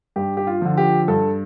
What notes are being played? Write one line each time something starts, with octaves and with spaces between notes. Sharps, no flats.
G2 G4
G4
F4
D3 F3
G4
G2 A4